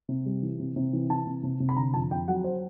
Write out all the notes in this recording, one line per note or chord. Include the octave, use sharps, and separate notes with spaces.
C3
G3
E3
C3
C3
E3
E3 A5
C3
C3
C3
B5
D3 A#5
F2 A5
F2 G5
F#3 F#5
C5